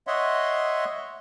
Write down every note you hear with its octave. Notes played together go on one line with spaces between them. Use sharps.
C#5 D#5 E5 F#5 C6